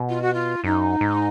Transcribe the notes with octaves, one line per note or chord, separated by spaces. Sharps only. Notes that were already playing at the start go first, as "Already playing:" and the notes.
Already playing: B2
F4
F#4
F4
F#2 D#4
G#2